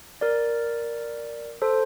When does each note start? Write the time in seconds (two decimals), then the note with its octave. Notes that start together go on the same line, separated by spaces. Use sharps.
0.21 A#4 D5
1.62 A4 C5